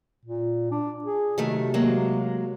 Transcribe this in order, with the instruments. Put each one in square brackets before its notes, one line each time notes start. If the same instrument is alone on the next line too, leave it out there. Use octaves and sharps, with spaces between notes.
[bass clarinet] A#2
D4
G#4
[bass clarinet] C3 [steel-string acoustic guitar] D#3 F#3 A3
[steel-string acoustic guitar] F#3 G#3 A#3